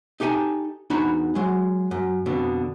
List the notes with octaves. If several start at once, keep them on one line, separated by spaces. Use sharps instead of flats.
D#4 G4 A4 F5 G#5 A#5
E2 D4 D#4 F#4 A#5 B5
F#3 G#3
F#2
F2 B2 D3